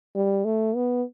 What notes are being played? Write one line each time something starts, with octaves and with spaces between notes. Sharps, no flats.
G3
A3
B3